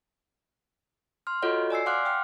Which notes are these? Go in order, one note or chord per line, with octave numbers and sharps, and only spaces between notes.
C6 F6
F4 F#4 A4 C#5 D#5 F#5
D5 G#5 E6 C7
F5 F#5 C6 D6 F6 F#6
G5 F6